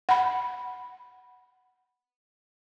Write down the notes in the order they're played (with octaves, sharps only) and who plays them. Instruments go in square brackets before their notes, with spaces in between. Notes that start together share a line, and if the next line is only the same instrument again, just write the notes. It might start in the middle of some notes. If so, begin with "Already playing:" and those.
[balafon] F#5 B5